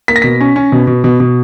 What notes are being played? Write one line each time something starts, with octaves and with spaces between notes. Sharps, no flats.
A#3 B6
A#6
B2 B6
C#4
C#4
B2
B2
B2
B2